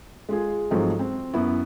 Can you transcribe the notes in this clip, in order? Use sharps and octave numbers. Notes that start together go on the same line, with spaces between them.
G#3 F4 G#4
G#2 F3 F#3 A3 C4 D#4
C4
F#2 B3 E4